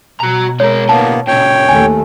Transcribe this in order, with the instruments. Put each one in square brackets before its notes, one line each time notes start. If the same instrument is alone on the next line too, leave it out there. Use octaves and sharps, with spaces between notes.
[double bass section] B2 [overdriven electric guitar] F#4 A#5
[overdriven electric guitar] G#3 A#4 [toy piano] C#5
[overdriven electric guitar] D2 A2 [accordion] A#3 B3 [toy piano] A5
[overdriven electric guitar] A#2 C#3 [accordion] C#5 G5
[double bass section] D#2 A3 [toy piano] G#5